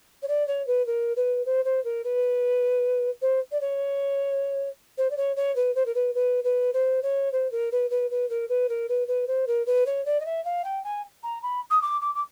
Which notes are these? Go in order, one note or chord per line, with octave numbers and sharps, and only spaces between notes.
C#5
D5
C#5
B4
A#4
B4
C5
C5
A#4
B4
C5
D5
C#5
C5
D5
C#5
C#5
B4
C5
A#4
B4
B4
B4
C5
C#5
C5
A#4
B4
B4
B4
A#4
B4
A#4
B4
B4
C5
A#4
B4
C#5
D5
D#5
E5
F5
G5
G#5
A#5
B5
D#6
D6
D6
D6